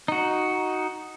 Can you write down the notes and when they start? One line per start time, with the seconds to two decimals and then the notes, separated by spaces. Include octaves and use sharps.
0.08 D#4 F#4